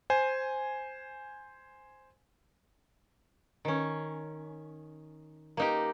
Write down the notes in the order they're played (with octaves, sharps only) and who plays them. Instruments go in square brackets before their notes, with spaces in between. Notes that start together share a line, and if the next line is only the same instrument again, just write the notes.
[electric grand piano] C5 G#5
[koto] D#3 C#4
A#3 D#4 G4